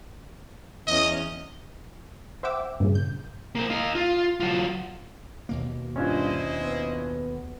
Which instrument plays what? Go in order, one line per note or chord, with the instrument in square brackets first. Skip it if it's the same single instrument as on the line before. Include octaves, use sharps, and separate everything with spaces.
[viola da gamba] E2 C#4 [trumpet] D#5
[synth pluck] C5 E5 F#5 G5 D6 E6
G2 A#2 C#3
G6
[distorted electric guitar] A#3 C5
D#4 F5
F4
F#3 F4
[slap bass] D#2 B2 A#3
[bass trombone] G2 [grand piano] C#4 D4 F4 [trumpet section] E4 C5 D#5
[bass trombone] B3